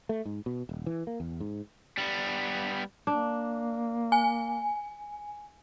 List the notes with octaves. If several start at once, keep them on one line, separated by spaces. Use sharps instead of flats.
A3
G#2
B2
D#1
E3
A#3
E2
G#2
G3 B3
A#3 D4
G#5